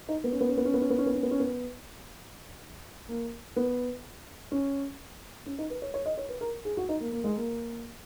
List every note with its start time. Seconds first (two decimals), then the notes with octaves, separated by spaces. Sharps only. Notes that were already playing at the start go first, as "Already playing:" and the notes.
0.09 D#4
0.24 B3
0.32 C#4
0.41 B3
0.49 C#4
0.57 B3
0.65 C#4
0.74 B3
0.82 C#4
0.90 B3
0.98 C#4
1.06 B3
1.15 C#4
1.23 B3
1.31 C#4
1.40 B3
3.09 A#3
3.56 B3
4.52 C#4
5.46 C#4
5.59 D#4
5.70 B4
5.82 C#5
5.94 C#5
6.06 D#5
6.18 C#5
6.29 B4
6.41 A#4
6.65 G#4
6.77 F#4
6.89 D#4
7.00 A#3
7.12 A#3
7.24 G#3
7.36 A#3